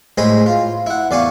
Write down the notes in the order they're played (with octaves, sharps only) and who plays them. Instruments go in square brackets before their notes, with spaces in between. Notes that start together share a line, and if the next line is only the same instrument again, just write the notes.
[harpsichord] A2 G#3 C5 G#5 A#5 B5
F4
E4 F#5
E2 D5 F5 G#5 C#6